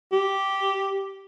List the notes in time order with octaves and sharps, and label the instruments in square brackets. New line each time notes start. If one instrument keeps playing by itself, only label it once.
[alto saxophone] G4